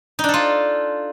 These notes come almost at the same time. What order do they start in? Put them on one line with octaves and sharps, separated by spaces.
D#4 D4 A4 F4